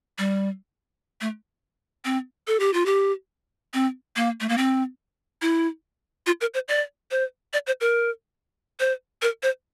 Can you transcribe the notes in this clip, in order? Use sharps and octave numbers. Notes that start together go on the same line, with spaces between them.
G3
A3
C4
A4
G4
F4
G4
C4
A#3
A3
A#3
C4
E4
F4
A#4
C5
D5
C5
D5
C5
A#4
C5
A#4
C5